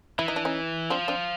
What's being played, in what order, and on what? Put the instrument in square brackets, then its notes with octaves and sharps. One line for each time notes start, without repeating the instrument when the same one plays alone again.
[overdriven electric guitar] E3 [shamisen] E4
[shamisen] D#4
D4
C#4 D#4
[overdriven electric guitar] F3 [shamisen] C4 D4
[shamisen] C4 D4